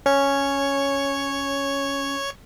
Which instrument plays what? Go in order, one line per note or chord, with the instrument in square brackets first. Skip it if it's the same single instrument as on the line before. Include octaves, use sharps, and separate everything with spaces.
[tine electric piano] C#4 [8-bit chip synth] C#5 C#6